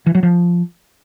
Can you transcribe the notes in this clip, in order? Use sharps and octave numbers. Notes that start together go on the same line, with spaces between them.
E3
F#3
F3